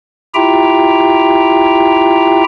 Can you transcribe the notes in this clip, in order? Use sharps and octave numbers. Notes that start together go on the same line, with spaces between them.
E4 F4 G4 E5 G5 A#5